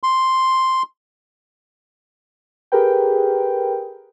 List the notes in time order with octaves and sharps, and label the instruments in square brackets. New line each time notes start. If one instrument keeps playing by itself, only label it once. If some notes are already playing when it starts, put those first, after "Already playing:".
[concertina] C6
[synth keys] G4 G#4 A#4 B4 G5